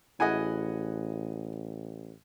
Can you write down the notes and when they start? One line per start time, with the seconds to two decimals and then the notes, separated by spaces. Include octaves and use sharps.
0.20 A1 E4 F#4 G#4 D#5 F#5 G#5